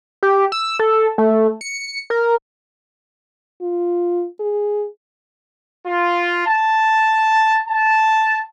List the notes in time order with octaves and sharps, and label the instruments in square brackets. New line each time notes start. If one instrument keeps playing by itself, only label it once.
[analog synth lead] G4
E6
A4
A3
C#7
A#4
[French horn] F4
G#4
[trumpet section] F4
A5
A5